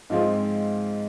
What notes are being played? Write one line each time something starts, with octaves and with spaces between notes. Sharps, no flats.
G#2 F3 G#3 C4 F4